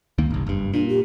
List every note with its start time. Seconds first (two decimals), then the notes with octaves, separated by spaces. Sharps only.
0.18 D2 D#3 A#3
0.31 G1 C2
0.46 F#1 G2
0.74 A#2 D4
0.89 G4